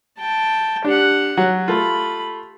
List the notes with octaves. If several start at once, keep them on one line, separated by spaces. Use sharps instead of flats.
G5 A5
D4 G4 F#5
F#3
A3 F4 B5